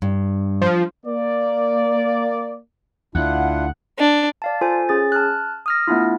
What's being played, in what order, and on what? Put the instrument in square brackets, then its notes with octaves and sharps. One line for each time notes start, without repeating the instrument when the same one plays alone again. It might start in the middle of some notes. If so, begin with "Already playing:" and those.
[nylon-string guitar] G2
[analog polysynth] F3
[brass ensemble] A#3 D5
[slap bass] D2 [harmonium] D4 E4 F4 [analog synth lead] F#5
[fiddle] D4
[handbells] D5 F5 A5
F4 A4 C5 G#5
C#4 G#4 A6
A5 F6 F#6
D#6 F6 A#6
A3 B3 D4 E4 F4